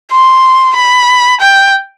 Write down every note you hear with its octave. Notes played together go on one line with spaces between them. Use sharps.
C6
B5
G5